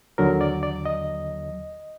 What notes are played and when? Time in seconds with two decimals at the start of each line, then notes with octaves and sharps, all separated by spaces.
0.18 D#2 D3 F#3 A#4
0.41 D5
0.63 D5
0.85 D#5